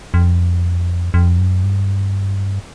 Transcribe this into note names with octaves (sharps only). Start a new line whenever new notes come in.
F2
F2
F#2
G2